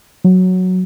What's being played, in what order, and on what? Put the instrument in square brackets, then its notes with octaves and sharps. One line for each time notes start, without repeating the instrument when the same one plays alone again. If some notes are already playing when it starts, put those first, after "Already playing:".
[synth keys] F#3